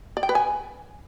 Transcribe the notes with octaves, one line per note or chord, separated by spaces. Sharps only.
D5
G5
B4
G#5